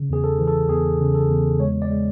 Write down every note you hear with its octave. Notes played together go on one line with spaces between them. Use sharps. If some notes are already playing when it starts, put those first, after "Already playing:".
Already playing: C#3
E2 G#4
A4
E3
A4
E2 G#4
C#3
A4
E2
G#3 C#5
D5
G#3